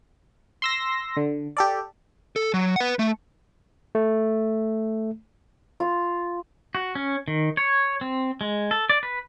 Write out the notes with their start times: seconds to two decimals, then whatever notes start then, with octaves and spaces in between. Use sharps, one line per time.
0.62 C6 E6 A#6
1.17 D3
1.57 G4 A4 D5
2.36 A4
2.54 F#3
2.76 B4 F#5
2.99 A3
3.95 A3
5.80 F4
6.75 F#4
6.95 C#4
7.28 D#3
7.57 C#5
8.01 C4
8.41 G#3
8.71 A4
8.90 D5
9.03 B4